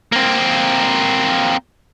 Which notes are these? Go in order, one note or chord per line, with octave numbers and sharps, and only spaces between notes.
A#3 C4